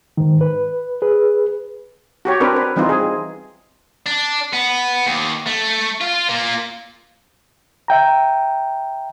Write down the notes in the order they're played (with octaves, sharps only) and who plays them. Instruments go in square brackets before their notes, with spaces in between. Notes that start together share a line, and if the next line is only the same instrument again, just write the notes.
[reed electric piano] G#2 D#3
B4
G#4 B4
[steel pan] F#4 G4 C#5
C4 D4 A#4 B4
B4
E3 G3 C4 D#4 F4
G#4
[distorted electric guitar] D4
B3
D#2
A3
F4
A#2 A#3
[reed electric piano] E5 G5 A#5